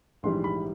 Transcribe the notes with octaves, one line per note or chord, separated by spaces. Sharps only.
A#1 G#2 E3 G3 C6
B5